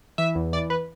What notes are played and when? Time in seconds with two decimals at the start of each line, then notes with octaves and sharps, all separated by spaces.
0.18 E3 E5
0.35 E2
0.53 E3 D5
0.70 B4